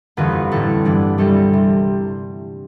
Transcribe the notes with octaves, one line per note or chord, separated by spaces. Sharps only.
G1 F2 E3 B4
A1 A2 G3 A4
G2 E3 G3 B3 D4
C2 C3 G3 C4 A4
C3